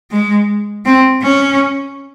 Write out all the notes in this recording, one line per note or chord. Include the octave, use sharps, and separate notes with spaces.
G#3
C4
C#4